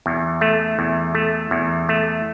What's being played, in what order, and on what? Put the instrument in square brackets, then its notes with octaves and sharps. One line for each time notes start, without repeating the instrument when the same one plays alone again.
[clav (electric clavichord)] E2
A3
E2
A3
E2
A3